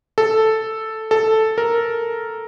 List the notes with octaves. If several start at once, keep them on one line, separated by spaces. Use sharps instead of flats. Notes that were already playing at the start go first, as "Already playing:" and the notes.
A4
A4
A#4